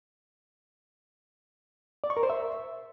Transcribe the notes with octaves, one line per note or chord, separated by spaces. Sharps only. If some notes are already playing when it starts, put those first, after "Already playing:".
D5
C#6
A#4
C5
E5